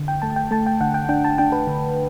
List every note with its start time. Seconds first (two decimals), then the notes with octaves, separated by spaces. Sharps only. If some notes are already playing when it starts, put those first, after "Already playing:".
Already playing: D3
0.08 G5
0.22 A3 A5
0.36 G5
0.51 A3 A5
0.66 G5
0.81 D3 F#5
0.94 G5
1.09 D4 G5
1.24 A5
1.38 D4 G5
1.52 B4
1.67 D3